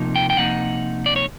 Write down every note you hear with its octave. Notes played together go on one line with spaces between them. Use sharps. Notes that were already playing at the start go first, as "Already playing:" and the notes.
Already playing: C3 F3 A#3 D#4
G5
G5
C3 F3 A#3 D#4 F#5
D5
C#5